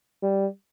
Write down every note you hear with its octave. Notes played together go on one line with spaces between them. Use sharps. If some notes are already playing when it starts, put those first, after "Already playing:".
G3